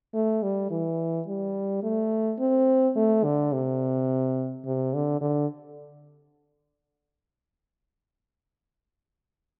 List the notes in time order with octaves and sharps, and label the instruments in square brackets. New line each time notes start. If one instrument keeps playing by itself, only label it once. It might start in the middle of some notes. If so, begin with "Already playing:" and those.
[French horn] A3
G3
E3
G3
A3
C4
A3
D3
C3
C3
D3
D3